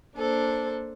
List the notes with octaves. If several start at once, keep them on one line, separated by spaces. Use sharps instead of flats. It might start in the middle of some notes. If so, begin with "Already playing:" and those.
A#3 D4 A4 C5